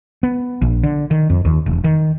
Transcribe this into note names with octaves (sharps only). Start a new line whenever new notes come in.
B3
A#1
D3
D#3
F2
D#2
E1
D#3